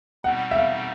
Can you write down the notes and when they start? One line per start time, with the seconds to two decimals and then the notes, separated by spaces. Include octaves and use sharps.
0.24 B2 G3 C4 D#4 F#5
0.51 E5
0.56 F5